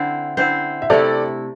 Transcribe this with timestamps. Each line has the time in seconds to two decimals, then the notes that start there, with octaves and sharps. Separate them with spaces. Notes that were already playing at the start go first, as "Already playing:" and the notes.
Already playing: D3 C4 E4 C5
0.37 D3 C4 E4 C5
0.82 E5
0.90 C3 A3 E4 A4 D5